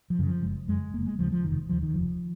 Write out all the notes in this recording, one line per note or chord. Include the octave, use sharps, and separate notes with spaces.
F3
F#2 C#3
F3
F#1 G#3
F#2 C#3 G#3
F1 A#3
G#3
D#2 C#3 F3
F3
F1 D#3
D#2 C#3 F3
D#3
F1 F3